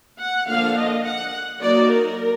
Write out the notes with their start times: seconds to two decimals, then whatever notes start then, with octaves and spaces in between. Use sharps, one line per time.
0.18 F#5
0.47 D3 F3 A#3 D4 F5
0.76 D#5
1.04 F#5
1.61 F#3 A#3 D#4 D5
1.91 A#4